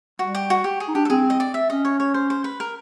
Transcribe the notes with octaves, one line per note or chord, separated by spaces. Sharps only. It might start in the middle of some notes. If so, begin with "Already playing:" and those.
G3 F#4
G4
F#4
G4
G#4
D#4
D4 G4
A4
C4 G#4
D#5
D5
E5
C#4 D#5
C#5
C#5
C5
C5
B4
A#4